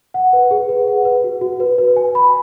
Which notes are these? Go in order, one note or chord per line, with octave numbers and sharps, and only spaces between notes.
F#5
B4
G#4
B4
F#5
B4
F#4
F#4
B4
B4
G#5
B5